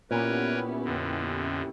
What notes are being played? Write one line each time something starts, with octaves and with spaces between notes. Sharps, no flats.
A#2 B3 C#4 E4 G4 A#4 B4 C#5
F2 D3